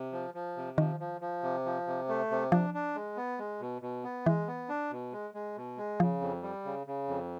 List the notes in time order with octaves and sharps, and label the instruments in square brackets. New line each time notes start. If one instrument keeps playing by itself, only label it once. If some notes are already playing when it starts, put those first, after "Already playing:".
Already playing: [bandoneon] C3
F3
F3
C3
[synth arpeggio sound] D#3 [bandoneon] F3
[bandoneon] F3
F3
C3
F3
C3
A3
C3
[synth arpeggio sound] F3 [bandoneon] D4
[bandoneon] D4
G#3
B3
G#3
B2
B2
B3
[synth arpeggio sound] E3 [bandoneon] G#3
[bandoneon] B3
D4
B2
G#3
G#3
B2
G#3
[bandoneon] C#3 [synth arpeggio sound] F3
[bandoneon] F2
G3
C#3
C#3
F2